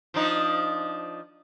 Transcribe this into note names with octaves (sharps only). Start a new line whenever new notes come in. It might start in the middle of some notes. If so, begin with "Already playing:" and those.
F3 D4 D#4